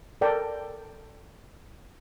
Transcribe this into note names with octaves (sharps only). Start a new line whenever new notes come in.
A4 A#4 D5 G5